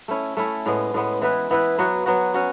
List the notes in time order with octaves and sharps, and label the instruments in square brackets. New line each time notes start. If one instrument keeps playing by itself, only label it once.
[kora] A3 C#4 E4
A3 C#4 E4
A2 G#3 B3
A2 G#3 B3
E3 B3 E4 B4
E3 B3 E4 B4
F#3 B3 F#4
F#3 B3 F#4
C#4 F#4